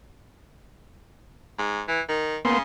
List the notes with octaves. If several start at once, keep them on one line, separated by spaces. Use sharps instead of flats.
G#2
E3
D#3
C#3 A#3 B3 C6